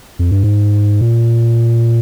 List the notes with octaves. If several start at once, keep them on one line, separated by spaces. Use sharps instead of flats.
F2
G2
G#2
A#2